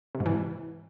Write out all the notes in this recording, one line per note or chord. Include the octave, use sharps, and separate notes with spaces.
C3
G#2
E3